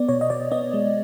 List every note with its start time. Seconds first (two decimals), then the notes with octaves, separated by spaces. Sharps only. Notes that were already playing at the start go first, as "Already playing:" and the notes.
Already playing: B3 D5
0.08 B2 C#5
0.21 D#5
0.30 B2 D5
0.51 B3 D#5
0.73 G#3